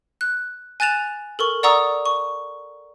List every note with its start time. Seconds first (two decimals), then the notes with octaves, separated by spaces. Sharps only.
0.21 F#6
0.80 G#5 F#6 A6 E7 F7
1.39 A4 A#4 C#6
1.63 D5 F#5 A#5 C#6 D#6 E6
2.06 C#6